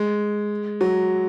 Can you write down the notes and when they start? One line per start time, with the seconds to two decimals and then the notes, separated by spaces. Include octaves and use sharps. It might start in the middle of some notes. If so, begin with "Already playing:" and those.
Already playing: G#3
0.81 F#3